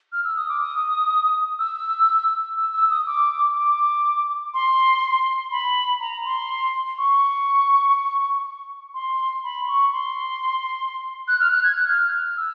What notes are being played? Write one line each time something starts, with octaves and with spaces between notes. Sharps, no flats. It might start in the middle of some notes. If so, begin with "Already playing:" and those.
F6
E6
D#6
D6
D#6
E6
E6
E6
D#6
D6
D6
C6
B5
A#5
C6
C#6
C6
B5
C#6
C6
F#6
F6
F#6
G#6
F#6
F6
E6